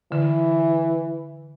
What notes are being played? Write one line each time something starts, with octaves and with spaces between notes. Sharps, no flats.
D3 E3